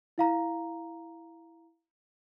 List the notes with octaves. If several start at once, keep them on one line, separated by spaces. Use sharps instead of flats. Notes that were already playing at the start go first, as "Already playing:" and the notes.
E4 F5 A#5